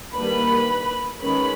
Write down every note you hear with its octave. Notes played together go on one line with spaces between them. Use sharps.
D#3 G3 A#3 D4 B4 B5
D#3 G#3 C#4 B4 B5